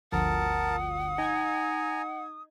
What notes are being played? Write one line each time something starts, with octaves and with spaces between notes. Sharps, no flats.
G1 D2 F3 A#4 F#5 A5 D#6
D#4 G#5 A#5 G#6